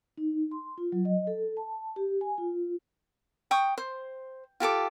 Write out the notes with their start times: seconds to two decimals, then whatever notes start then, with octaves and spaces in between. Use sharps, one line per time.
0.17 D#4
0.51 C6
0.78 F4
0.92 F#3
1.05 D#5
1.27 A4
1.57 A5
1.96 G4
2.21 G#5
2.38 F4
3.51 G5 C#6 D#6
3.78 C5
4.60 F4 G4 A4 D6